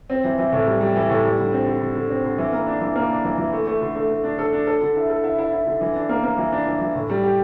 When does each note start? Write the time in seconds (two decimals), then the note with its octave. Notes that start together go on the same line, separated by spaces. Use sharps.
0.10 C4
0.24 E3
0.38 E3
0.52 A2
0.66 G3
0.81 G3
0.95 E3
1.10 A2
1.24 G3
1.39 D3
1.52 C4
1.67 D3
1.81 D3
1.95 D3
2.10 C4
2.24 D3
2.38 E3
2.53 A#3
2.67 D4
2.81 E3
2.96 A#3
3.10 D4
3.24 E3
3.38 E3
3.53 A3
3.67 A3
3.81 D3
3.95 A3
4.10 A3
4.24 D4
4.39 A4
4.53 D4
4.67 A4
4.81 D3
4.95 E4
5.09 A4
5.24 E4
5.38 E4
5.53 E4
5.67 D3
5.81 E3
5.95 D4
6.09 A#3
6.24 A#3
6.38 E3
6.52 D4
6.67 E3
6.81 E3
6.95 A2
7.10 G3
7.24 G4